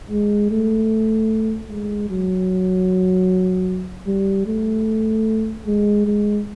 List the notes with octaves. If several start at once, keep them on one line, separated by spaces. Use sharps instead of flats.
G#3
A3
G#3
F#3
G3
A3
G#3
G#3